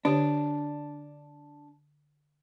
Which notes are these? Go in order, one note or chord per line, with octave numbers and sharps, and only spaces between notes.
D3 D4 G4 C#5